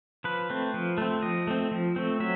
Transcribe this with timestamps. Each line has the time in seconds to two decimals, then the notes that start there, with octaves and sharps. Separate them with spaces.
0.24 F3 B4
0.50 A3 C4
0.74 F3
0.98 A3 C4
1.23 F3 D#5
1.47 A3 C4
1.72 F3
1.96 A3 C4
2.20 F#3 E5